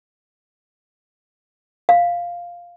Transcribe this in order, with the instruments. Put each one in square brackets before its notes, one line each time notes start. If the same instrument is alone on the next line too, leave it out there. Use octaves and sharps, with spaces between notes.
[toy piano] F5